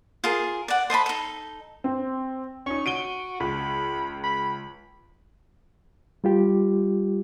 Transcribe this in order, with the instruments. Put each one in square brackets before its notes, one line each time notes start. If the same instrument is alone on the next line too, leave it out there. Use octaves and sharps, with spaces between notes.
[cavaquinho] F4 G#4 A#4
D5 F#5
C5 D#5 A5 B5
D#4 A4
[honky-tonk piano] C4
[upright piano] C#4 D#4 [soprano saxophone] C#6
[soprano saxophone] F#4 [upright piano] D7 D#7 G7
[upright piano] C#2 [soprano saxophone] B5
[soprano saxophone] B5
[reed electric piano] G3 F4 G4